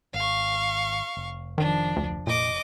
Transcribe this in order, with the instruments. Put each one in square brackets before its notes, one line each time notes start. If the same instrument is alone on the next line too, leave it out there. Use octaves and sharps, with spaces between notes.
[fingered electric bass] G#1 [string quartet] F5 C#6
[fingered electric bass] F1
[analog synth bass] D#3 [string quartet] F3 D4
[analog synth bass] D2
[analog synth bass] A#2 [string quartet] D#5 D6